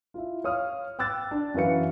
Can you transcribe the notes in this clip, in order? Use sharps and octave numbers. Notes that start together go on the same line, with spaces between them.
E4 F4
C#5 F5 D#6 F6
G5 D6 E6 F#6 A6
D4
F#2 E3 F#4 B4 F5 C#7